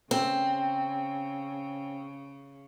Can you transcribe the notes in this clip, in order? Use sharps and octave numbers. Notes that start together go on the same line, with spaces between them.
C#3 C4